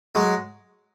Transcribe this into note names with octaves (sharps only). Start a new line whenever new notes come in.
F#3 G#3